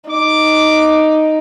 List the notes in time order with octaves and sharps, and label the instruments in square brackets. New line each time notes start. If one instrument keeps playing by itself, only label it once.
[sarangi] D#4 [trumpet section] D6